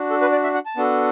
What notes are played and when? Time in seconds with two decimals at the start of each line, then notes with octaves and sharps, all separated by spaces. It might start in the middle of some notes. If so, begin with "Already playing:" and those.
Already playing: D4 F#4
0.10 A4
0.21 B4
0.32 D5
0.43 E5
0.54 F#5
0.66 A5
0.77 B3 D4 F#4 A4